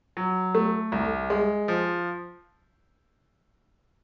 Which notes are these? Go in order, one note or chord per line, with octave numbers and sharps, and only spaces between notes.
F#3
A3
C2
G#3
F3